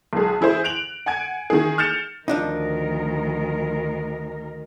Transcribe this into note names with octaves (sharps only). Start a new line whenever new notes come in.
B1 G#3 G#4
E3 E4 G#4 C5
F#6 D7 F7 F#7
F#5 G#5 G#6 D7
D#3 E3 G#4
F6 G6 A6 C#7 E7 F7
D2 D#3 F3 D4 D#4 A#4